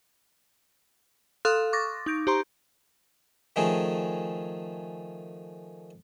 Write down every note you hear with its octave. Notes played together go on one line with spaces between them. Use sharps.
A4 F5 C6 D#6 F6 F#6
C#6 D6 A6 A#6
D#4 G6 D7
G4 C5 A#5 C6
D#3 F3 A3 C#4 G#4